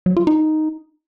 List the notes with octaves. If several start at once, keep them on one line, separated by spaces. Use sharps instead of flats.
F#3
F4
D#4